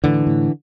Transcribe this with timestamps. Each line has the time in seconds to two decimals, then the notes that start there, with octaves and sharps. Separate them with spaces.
0.04 A2 D3 E3
0.27 A2